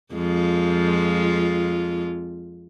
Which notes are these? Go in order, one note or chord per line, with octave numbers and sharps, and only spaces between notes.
F2 G#3 F4